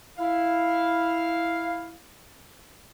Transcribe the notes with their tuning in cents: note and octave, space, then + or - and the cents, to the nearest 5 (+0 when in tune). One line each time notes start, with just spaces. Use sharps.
E4 +0 F5 +0